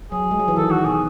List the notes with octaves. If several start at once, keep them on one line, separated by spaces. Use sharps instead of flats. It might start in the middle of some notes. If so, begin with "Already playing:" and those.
F#3 G#4
G#3
F#3
E3
D#3 A4
F#4
B2 G#4